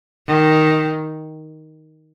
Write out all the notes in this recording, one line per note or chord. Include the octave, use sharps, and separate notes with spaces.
D#3